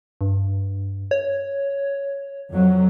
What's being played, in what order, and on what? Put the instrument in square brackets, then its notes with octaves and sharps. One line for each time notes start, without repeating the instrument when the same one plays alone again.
[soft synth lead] G2
C#5
[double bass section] F2 F#3